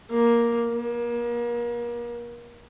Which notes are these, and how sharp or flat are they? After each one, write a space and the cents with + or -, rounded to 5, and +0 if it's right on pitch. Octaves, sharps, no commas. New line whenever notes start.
A#3 +5
A#3 +35